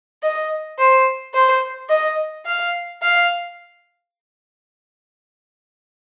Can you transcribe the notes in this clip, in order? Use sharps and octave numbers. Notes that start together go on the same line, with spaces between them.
D#5
C5
C5
D#5
F5
F5